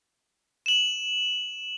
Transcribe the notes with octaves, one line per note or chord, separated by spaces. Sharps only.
E7 F#7